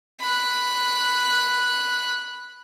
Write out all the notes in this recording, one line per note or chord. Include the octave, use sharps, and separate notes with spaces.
B5 F#6